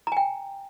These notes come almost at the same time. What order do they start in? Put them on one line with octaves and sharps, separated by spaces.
A#5 G#5 G5